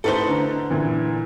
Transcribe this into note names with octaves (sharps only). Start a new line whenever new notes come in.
A2 D#4 A4 B4 C5 G7
D3 A#5
A#2 D3 E3